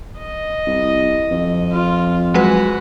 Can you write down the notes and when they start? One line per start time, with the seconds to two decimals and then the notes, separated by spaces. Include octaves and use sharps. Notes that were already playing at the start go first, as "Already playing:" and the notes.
0.19 D#5
0.67 C2
1.31 F2
1.72 F4
2.34 F#3 G#3 F#4 B4